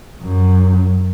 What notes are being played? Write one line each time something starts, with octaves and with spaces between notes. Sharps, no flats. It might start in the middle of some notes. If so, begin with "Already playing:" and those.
F#2